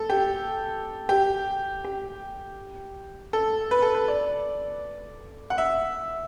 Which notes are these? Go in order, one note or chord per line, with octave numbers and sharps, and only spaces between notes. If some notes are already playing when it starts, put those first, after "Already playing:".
Already playing: A4
G4
G4
G4
A4
B4
A4
B4
D5
F#5
E5